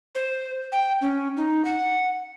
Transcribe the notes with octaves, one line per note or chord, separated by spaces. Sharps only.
C5
G5
C#4
D#4
F#5